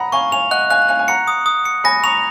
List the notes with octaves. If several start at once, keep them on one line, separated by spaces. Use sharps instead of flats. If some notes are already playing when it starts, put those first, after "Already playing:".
Already playing: F#5 A#5 B5 D#6
F5 G#5 C#6
F5 G#5 F7
D#5 F#5 F#6
F5 G#5 F#6
F5 G#5 F#6
G#5
F#5 A#5 C#7
D#6
D#6
C#7
G#5 B5 A#6
A#5 C#6 F7